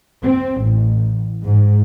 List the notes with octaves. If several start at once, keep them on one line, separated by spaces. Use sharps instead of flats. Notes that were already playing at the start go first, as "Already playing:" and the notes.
C4
A1
G#2